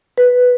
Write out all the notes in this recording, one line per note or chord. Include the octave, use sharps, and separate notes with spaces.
B4